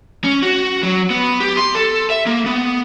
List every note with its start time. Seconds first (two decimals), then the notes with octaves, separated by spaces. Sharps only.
0.24 C#4
0.42 F#4
0.83 F#3
1.10 B3
1.40 G4
1.57 C6
1.75 A4
2.10 E5
2.26 A#3
2.46 B3